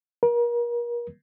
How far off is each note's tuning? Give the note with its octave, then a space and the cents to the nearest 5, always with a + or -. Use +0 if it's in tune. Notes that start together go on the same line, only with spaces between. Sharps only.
A#4 +35